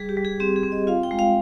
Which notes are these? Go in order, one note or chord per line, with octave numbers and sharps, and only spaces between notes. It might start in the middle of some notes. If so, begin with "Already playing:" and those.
Already playing: G3 G#4
G4
G3
G#4
C4 G4
G#4
C4
D#5
F4 F5
G5
G#3
F5